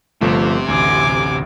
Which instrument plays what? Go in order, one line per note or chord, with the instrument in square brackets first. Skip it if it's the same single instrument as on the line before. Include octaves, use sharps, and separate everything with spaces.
[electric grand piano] G1 F3 A3 [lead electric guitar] C3
[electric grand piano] A1 D2 [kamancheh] G#5 D6